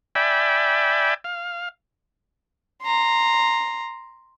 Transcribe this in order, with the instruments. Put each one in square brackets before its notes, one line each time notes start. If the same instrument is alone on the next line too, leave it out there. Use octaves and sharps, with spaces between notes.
[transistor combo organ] D5 E5 G5 G#5 B5
F5
[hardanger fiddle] A#5 C6